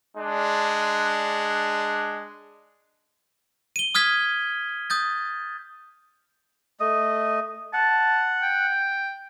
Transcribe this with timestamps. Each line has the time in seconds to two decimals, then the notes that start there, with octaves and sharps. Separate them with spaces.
0.16 G#3 D4
3.76 D#7 G7
3.95 D#6 F6 G#6 B6
4.90 D#6 G6 A6
6.80 A3 D#5
7.73 F#5 A5
8.42 G5